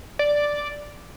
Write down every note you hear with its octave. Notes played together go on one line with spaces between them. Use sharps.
D5